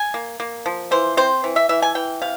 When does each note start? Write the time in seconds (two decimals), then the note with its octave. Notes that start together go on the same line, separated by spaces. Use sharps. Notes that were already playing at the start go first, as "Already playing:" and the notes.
Already playing: G#5
0.14 A#3
0.40 A#3
0.66 F3
0.91 E3 C5
1.17 C4 C5
1.44 E3
1.56 E5
1.69 E3 E5
1.82 G#5
1.95 E3 G5
2.22 C3 F5